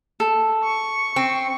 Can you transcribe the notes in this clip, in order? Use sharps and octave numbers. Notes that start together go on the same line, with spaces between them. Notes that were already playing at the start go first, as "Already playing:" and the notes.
A4
C#6
C4